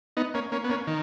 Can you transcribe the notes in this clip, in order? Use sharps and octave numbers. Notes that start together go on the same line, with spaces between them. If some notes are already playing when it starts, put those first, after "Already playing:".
B3 D#4
A#3 C#4
A#3 C#4
B3
A#3 C#4
D#3